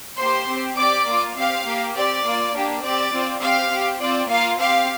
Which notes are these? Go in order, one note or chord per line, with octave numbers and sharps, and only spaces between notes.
A#3 G4 C5 C6
C4 G4
C4 G4 D5 D6
A#3 F4
C4 G4 F5
A#3 G4
C4 G4 D5
A#3 F4
A#3 D4 G4
C4 G4 D5
C4 F4
C4 G4 F5
C4 G4
C4 F4 D5
A#3 F4 F5
C4 G4 F5